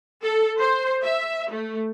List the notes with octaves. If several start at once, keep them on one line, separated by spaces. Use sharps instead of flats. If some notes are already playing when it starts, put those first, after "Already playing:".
A4
C5
E5
A3